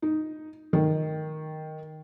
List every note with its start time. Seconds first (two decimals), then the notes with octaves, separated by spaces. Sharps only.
0.02 D#4
0.73 D#3